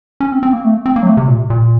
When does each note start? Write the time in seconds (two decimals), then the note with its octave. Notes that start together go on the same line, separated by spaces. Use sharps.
0.20 C#4
0.32 C4
0.43 C4
0.53 A#3
0.64 A3
0.86 C4
0.96 A#3
1.03 F#3
1.07 A3
1.17 C3
1.28 A#2
1.50 A#2